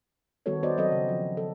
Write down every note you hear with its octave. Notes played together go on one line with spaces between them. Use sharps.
D#3 G3 B3 F#4 A4 C#5
B3 F#4 C5 D5 D#5
F#3 C4 A4 D#5
C#3
F3
A4